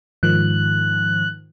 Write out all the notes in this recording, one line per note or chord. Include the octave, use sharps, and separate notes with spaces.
G#2 D#3 F3 F#6